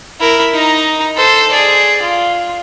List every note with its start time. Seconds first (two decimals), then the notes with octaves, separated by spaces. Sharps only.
0.20 E4 A#4
0.54 D#4 A#5
1.17 A4 C5
1.52 G#4 D5
2.02 F4